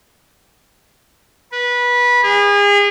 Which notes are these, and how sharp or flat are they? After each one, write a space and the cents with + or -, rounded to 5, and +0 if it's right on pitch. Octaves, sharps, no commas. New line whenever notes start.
B4 -20
G#4 -35